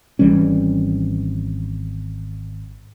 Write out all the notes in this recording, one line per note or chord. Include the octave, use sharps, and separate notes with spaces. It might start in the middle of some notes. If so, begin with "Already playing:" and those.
G#1 E3 G3 C#4